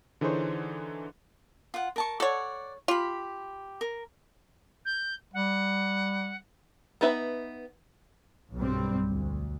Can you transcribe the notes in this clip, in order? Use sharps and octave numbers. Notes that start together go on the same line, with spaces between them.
D3 E3 D#4 G#4 C5 C#5
F4 F#5
A#4 A5 C#6
A4 C#5 D5 F#5
F4 G4 B5
A#4
G6
G3 F#5
B3 D#4 B4 E5
B1 G2 G3 C4
D2